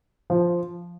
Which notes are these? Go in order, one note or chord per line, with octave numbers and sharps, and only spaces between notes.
F3